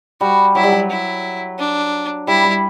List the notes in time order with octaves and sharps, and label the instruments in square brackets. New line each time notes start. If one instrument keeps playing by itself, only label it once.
[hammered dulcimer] G3 [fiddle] F#4
[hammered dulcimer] F#3 [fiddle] E4
[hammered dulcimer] G3
F#3
[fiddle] E4
D4
[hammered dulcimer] G3 [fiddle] E4
[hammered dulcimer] G3